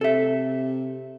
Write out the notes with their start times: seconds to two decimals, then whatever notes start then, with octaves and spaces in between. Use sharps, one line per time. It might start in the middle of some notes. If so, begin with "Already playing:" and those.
0.01 C3 A4 E5